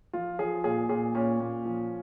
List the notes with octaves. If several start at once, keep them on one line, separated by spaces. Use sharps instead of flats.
F3 F4
F3 G#4
A#2 G#4
A#2 G#4
A#2 C#4
A#2
F3